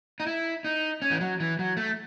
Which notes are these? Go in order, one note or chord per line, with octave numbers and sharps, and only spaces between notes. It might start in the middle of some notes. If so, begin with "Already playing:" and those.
D#4
E4
D#4
C#4
E3
F#3
E3
F#3
A3